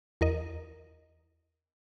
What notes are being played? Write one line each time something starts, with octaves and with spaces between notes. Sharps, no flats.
E2 A#4 D#5